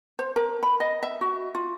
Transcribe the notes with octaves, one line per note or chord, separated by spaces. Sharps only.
C5
A#4
B5
D#5
E5
F#4
F4